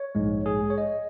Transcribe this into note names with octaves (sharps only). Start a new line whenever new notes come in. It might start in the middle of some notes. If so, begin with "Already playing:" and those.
Already playing: C#5
A#1 G#2 G#3
G#4
C#5
D#5